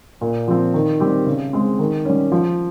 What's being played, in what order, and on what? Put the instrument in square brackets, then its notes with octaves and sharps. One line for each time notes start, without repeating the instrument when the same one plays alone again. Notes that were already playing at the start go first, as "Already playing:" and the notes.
[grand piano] A#2
F3 C4
D#3
G3 C4 G4
C#3
G#3 C4
D#3
G3 C#4
F3